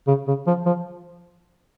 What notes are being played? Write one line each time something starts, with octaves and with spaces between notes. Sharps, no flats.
C#3
C#3
F3
F3